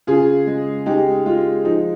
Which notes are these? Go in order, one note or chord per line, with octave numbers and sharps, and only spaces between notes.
C#3 F4 G#4
G#3
G#3 D#4 G4
G#3 F4
F3 D#4